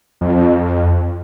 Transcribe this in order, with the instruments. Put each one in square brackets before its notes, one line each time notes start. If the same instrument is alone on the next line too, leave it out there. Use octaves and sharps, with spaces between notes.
[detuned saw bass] F2